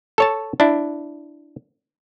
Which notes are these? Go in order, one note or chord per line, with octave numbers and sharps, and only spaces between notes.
A4 C#5 A5
D4 E4